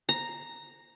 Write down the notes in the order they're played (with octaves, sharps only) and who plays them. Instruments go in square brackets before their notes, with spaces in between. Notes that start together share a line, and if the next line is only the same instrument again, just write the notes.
[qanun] A#5